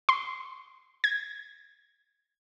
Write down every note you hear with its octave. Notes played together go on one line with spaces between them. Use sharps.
C6
G#6